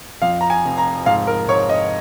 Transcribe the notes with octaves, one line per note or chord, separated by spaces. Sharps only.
F2 F5
A#5
G#5
F1
A#5
G#2 F5
A#4
G#2 C#5
D#5